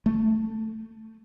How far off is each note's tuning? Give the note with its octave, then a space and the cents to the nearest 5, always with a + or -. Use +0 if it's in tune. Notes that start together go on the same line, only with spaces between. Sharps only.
A3 +10